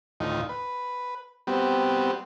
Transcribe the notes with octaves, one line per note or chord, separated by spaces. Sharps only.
D2 A2 D#3 D#4 F4
B4
G3 B3 C4 F#4 G4